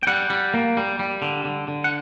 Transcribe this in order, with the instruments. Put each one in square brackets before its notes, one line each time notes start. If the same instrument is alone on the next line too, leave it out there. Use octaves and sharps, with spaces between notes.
[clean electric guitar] G5
G3 F#5
G3
A#3
G3
G3
D3
D3
D3
F#5